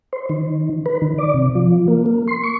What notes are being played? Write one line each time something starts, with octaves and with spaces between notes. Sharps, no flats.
C5
D#3
B4
D#3
D5
C3
F3
A#3
A#3
C6
C#6